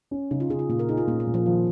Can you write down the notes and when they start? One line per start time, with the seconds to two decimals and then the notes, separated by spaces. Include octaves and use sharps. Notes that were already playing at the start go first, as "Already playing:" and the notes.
0.11 C#4
0.31 C#3 D#4
0.40 F4
0.50 C#3 G#4
0.59 F4
0.69 A#2 F4
0.79 A#4
0.89 D#4 G#4
0.97 F4
1.07 A#2 C#4
1.20 A#3
1.27 A#2
1.34 F3
1.46 D#3 F3